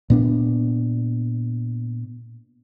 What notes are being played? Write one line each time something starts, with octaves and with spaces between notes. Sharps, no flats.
A#2 B3 D4